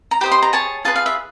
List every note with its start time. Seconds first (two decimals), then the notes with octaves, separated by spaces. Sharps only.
0.11 A#5
0.21 G4 C5 D#5 B5
0.31 C6
0.42 A#5
0.53 G#4 C#5 A5
0.85 F4 G#4 B4 A5
0.96 F5
1.06 E5